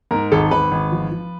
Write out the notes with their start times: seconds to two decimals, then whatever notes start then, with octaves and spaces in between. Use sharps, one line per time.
0.11 G#2 A#4
0.32 G#1 A4
0.51 G#1 B4
0.71 G#1
0.92 F3
1.12 F3